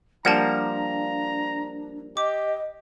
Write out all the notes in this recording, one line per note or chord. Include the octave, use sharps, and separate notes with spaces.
F3 G3 A#3 D4 F#5 A5 A#5
G4 D#5 D6